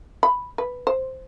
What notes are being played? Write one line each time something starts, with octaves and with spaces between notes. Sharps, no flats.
B5
B4
C5